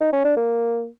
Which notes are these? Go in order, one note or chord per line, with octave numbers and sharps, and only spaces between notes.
D#4
C#4
D4
A#3